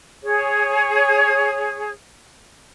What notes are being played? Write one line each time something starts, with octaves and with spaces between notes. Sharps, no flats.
G#4 C#5